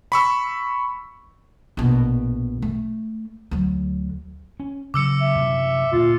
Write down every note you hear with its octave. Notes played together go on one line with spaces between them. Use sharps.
B5 C#6 E6
A#1 B2
A3
D2 F#3
C#4
C#3 F#3 D6 E6 C#7
E5
F#2 C3
D2 A#2 F4